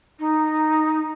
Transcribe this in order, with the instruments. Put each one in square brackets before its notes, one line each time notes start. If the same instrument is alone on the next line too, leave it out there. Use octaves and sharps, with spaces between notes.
[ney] D#4